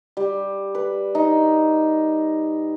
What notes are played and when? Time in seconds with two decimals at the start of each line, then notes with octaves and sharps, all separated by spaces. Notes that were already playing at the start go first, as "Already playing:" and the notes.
0.17 G3
0.75 B4
1.15 D#4